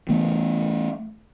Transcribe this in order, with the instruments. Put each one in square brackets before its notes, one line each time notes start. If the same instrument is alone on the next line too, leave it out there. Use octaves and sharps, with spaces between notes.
[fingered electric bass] E3 A3 B3